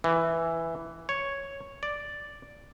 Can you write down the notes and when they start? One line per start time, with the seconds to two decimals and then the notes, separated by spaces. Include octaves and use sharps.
0.04 E3
1.09 C#5
1.83 D5